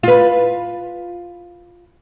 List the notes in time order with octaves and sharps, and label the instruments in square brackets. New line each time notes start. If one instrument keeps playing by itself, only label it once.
[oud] F4 B4